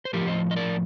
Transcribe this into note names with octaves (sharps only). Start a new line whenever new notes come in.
C5
A2 F3 G4 A#4
C5 D#5
D#5
A#4 D5